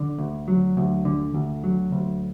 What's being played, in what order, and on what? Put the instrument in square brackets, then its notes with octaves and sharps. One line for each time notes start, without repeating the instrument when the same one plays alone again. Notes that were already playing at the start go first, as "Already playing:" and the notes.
Already playing: [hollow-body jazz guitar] D3
D2
F#3
D2
D3
D2
F#3
D2